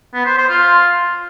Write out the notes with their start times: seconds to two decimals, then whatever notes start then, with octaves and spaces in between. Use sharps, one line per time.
0.14 B3
0.26 C5
0.38 C5
0.49 F4